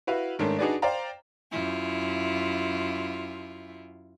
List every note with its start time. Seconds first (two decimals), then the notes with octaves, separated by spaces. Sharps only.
0.07 E4 F#4 B4 F5
0.39 G#2 D#3 A3 C#4 D4
0.59 D4 D#4 F#4 G#4 B4 D5
0.82 C5 D5 F5 G5 A#5
1.52 F#2 E4 F4